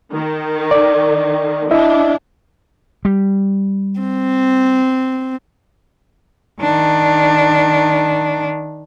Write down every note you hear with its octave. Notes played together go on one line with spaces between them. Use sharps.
D#3
D5
D4 E4 D#5 E5
G3
C4
D#3 D4